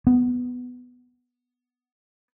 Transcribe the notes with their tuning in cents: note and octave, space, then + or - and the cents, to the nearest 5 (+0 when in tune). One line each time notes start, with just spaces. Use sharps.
B3 +5